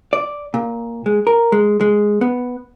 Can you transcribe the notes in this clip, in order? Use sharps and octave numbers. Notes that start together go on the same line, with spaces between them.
D5
A#2
G#3
A#4
G#3
G#3
B3